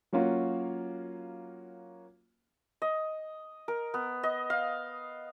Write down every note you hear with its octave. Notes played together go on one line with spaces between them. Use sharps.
F#3 A#3 C#4 F4 F#4
D#5
A#4
B3
D#5
F5